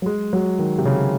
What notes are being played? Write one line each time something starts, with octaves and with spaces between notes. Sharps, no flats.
F#3
G#3
F#3
D#3
C3
C#3